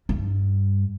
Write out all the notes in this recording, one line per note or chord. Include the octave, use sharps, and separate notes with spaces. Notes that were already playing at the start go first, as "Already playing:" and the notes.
G2